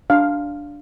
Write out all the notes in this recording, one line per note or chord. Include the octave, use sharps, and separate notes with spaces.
D4 F5